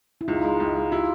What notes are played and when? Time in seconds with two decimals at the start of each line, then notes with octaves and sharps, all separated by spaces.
0.21 E4
0.28 C#2 D#4 F4
0.44 G#3
0.60 C#2
0.76 G#3
0.91 E4 F4 G4